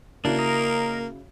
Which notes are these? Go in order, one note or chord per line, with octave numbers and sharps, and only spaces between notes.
C#3 A#3 D4 E4 F#4
A#4 D#5